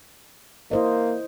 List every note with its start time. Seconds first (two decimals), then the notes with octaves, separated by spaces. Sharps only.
0.71 A#3 E4 C5 D#5